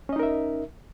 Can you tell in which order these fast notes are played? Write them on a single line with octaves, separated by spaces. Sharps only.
C#4 D#5 D#4 A#4 E5